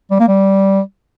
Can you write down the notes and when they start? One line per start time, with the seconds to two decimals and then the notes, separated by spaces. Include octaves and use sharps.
0.11 G3
0.19 A#3
0.28 G3